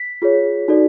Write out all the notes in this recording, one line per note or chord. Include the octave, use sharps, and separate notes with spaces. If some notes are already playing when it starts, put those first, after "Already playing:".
Already playing: B6
F4 G#4 C#5
D#4 F#4 A4 D5